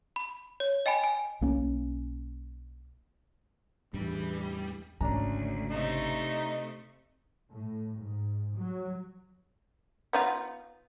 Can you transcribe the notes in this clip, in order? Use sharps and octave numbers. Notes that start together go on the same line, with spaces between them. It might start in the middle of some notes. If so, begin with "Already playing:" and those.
B5
C#5
D#5 G5 G#5 B5
G#5
B1 A#3 C#4
E2 A2 E3 G3 D4 G#4
G#1 D2 C#3 C#4 D4 A#5
C3 A3 D#4
A2
G#2
F#3
B3 D#4 F4